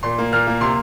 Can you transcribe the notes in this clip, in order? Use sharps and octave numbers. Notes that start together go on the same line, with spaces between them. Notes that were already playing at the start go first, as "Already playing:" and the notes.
A#2 C6
A#3
A#2 F6
A#3
C3 C6